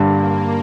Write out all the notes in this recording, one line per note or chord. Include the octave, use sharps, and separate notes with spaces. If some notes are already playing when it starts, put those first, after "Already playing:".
Already playing: G2 D3 G3 A#3